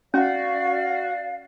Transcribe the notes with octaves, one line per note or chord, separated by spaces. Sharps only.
C#4 F#4 D5 F5 F#5